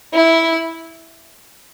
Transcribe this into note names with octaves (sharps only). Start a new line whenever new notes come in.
E4